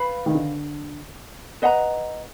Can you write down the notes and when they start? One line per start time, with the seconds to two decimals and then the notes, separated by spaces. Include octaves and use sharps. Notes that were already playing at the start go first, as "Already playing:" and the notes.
Already playing: B4 F5 B5
0.26 D#3
0.35 D3
1.62 B4 D#5 F#5 A#5